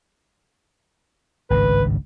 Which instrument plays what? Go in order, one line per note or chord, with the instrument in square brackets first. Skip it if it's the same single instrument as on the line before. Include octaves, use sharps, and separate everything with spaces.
[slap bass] G#1 C#2 G2 [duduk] B4